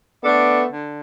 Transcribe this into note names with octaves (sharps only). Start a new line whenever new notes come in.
A3 B3 D4 A4 D5
D3